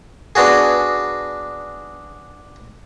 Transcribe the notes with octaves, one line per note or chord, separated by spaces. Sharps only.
B3 D4 F#4 G#4